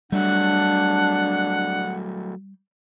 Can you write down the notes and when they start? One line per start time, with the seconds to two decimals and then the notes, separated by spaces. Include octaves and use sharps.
0.12 F#3 G3 A3 D4 F#5